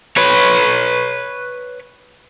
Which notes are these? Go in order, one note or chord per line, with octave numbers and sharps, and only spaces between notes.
B4 C#5